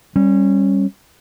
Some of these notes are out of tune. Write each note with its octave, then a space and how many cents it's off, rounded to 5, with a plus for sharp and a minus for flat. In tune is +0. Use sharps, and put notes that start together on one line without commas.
G3 +5 C#4 -20